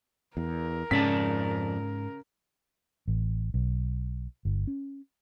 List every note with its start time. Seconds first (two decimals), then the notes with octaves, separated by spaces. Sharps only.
0.37 E2 A#4
0.91 F2 G#2 C#3 C#4 D5 A5 B6
3.08 A1
3.54 B1
4.45 G1
4.67 C#4